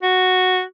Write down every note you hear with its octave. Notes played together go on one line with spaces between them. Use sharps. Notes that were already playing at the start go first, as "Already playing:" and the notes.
F#4